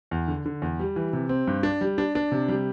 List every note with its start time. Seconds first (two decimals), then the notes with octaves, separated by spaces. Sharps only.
0.11 E2
0.28 D3
0.46 D3
0.62 E2
0.80 G3
0.96 E3
1.13 C3
1.29 C4
1.47 G2
1.63 D4
1.81 G3
1.98 D4
2.15 D4
2.32 C3
2.48 G3